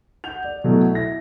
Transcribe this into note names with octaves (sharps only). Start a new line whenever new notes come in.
F#5 G6 F7
D5
B2 F#3 A3 E4
E4 A#6